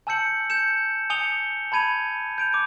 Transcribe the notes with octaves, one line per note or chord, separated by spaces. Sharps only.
G#5 A5 E6 G6 C#7 F#7
G6 C#7 E7
G#5 D#6 C#7 F7 G7
A5 B5 G#6 D#7 F7
G6 D7 F7
D6 D7